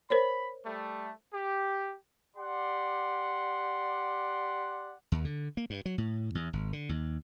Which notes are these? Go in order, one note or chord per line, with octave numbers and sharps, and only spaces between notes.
A#4 C5 C#5 B5
G3 A3
G4
G4 D5 F#5 C6
D#2
D3
A#3
G2
F#3
A2
E2
G#1
D3
D#2